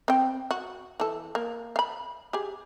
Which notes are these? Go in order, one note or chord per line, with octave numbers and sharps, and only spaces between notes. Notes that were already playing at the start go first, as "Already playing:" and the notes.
C4 G5
F#4
E3 A4
A#3
F5 B5
G4 G#4